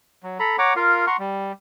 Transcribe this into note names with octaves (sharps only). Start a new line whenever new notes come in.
F#3
A4 A#5 B5
C#5 F#5 A#5 D6
F4 A#4 F5
F#5 A#5 C6 C#6
G3